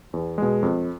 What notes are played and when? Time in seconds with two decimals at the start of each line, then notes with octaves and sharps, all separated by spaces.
0.13 E2
0.38 B2 G#3
0.63 F2